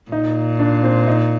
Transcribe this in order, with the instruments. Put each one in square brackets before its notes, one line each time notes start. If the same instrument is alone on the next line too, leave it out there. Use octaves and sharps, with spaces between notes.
[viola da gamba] A#2 [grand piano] D#4
[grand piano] D4
C4
D#4